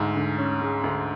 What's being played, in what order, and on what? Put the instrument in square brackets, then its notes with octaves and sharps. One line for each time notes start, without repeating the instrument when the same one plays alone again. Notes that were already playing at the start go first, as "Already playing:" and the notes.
Already playing: [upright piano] D2 G#3 [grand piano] G#2
[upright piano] D3
C#4
G#3
D2